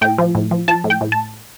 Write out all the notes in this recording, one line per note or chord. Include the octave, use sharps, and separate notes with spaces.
A2 G5
F3
A2
F3
F3 A5
A2
G5
A2
A5